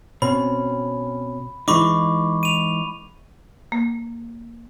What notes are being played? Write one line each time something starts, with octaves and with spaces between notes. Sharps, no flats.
B2 C4 C#4 B5
E3 G#3 D#4 B5 C#6 D6
D#7 F7
A#3